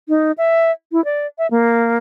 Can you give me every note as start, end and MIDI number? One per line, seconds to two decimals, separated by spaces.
0.08 0.32 63
0.38 0.71 76
0.92 1.04 64
1.05 1.26 74
1.38 1.47 76
1.51 1.97 58